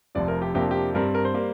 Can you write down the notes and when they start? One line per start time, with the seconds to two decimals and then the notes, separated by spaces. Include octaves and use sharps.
0.15 F1 F2 C3 D5
0.28 A#4
0.42 G4
0.54 F2 C3 A#3 D4 G4
0.71 G4
0.94 G2 G3 C4 A#4
1.15 A#4
1.25 C5
1.34 G3 A#3